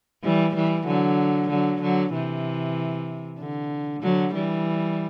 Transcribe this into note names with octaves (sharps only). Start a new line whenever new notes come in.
E3 G3
E3 G3
D3 F#3
D3 F#3
D3 F#3
C3 E3
D3
D3 F#3
E3 G3